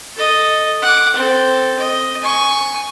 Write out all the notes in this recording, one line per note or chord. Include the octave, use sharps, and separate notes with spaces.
A4 D#5
F#5 D6
C4 A4
D#5
G#5 C#6